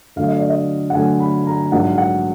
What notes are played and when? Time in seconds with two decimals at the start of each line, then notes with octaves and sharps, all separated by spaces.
0.16 D2 D3 F#3 F5
0.27 D#5
0.39 D5
0.49 D#5
0.90 F#5
0.94 D2 D3 F#3 G#5
1.20 B5
1.47 A#5
1.72 A#1 G#2 F#3 A#3 F#5
1.98 F#5